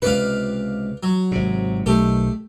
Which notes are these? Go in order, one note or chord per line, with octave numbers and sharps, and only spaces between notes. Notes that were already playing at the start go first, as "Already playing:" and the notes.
C#2 C3 B4 D5 F5
F#3
G#1 C3
B1 D#3 A3 G4